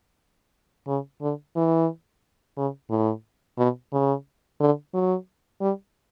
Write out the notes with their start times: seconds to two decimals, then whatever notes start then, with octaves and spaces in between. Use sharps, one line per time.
0.87 C#3
1.21 D3
1.56 E3
2.57 C#3
2.90 A2
3.58 B2
3.92 C#3
4.60 D3
4.94 F#3
5.61 G3